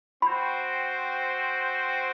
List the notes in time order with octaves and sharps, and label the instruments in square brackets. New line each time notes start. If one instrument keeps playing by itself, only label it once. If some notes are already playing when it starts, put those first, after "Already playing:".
[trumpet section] C4 F#4 C5 G5 [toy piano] B5